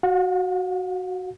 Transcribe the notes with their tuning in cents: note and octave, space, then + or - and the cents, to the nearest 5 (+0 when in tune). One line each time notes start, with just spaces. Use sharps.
F#4 +0 F5 +40